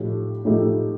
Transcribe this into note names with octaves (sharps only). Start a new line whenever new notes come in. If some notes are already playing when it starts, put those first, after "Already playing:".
Already playing: A2 F3 A3 D#4 G4
A2 F3 A3 D#4 G4